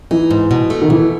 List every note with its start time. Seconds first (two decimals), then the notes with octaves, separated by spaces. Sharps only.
0.11 E3 D#4
0.31 G#2
0.51 B2
0.70 A3
0.82 D#3
0.90 B2 E3